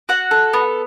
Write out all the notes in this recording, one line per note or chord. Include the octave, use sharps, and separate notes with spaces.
F#4 F#5
A4
B3